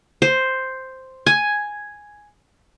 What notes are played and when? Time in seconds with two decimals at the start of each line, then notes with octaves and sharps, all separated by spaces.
0.22 C5
1.26 G#5